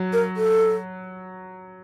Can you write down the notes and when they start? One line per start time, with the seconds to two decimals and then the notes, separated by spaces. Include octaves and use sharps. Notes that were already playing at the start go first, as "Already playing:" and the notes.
Already playing: F#3
0.13 A#4
0.37 A4